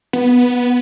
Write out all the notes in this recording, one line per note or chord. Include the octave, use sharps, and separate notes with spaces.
B3